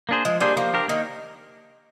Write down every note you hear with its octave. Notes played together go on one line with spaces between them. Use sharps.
A#3 D4 G#4 C5
F3 G#3
G3 A#3 D4 G#4 C5
F3 A#3
D4 G4 A#4
D#3 A#3